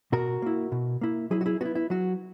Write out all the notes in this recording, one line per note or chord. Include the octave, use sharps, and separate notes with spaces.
B2 F#4 A#4
A#3 E4
B2
A#3 E4
F#3 E4 G#4
F#4
E4 G#4
B3 E4 F#4
E4
F#3 F#4